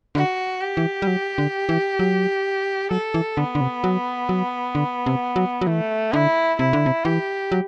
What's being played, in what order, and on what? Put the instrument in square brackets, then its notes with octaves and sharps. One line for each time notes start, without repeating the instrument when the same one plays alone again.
[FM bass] D3 [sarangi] F#4
[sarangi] G4
[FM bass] E3
G3
F#3
D3
E3
F#3
[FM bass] F#3 [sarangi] A4
[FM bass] E3
[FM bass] D3 [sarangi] B3
[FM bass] D3
C3
F#3
F#3
D3
C3
F#3
F#3
[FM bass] E3 [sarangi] A3
[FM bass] D3 [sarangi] E4
[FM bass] C3 [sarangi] E4
[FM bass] D3
C3
[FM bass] E3 [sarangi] G4
[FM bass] F#3